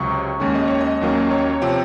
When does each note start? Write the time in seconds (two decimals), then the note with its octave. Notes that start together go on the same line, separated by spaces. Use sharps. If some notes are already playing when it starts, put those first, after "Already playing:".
Already playing: C#2 C3 F#3 C#6
0.40 D#2 D#3 G#3 C#4
0.55 D#5
0.68 C#5
0.81 D#5
1.01 D#2 D#3 F#3 A#3 C#4
1.31 C#5
1.62 C3 F3 C4